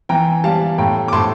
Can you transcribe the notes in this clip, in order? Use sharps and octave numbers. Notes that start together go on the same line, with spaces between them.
E3 G5 A#5
G3 F5 A5
A2 G5 A#5
D6
A2 A5 C6